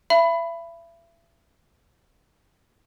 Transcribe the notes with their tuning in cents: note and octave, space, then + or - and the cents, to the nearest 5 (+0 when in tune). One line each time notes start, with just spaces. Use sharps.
E5 +35 B5 +0